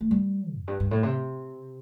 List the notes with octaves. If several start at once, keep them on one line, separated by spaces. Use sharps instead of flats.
A3
G3
F2
G2
G2
A2
C3